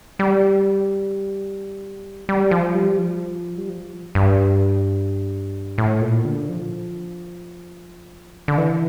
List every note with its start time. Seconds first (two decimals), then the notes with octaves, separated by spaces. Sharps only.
0.19 G3
2.29 G3
2.51 F3
2.75 G3
2.98 F3
3.58 G3
3.69 F3
4.15 G2
5.78 A2
6.01 A#2
6.25 D3
6.49 F3
8.48 D3
8.58 E3